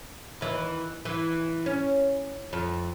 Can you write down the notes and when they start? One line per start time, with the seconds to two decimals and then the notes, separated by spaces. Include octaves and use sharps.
0.41 D#2 E3
1.05 E3
1.66 C#4
2.53 F2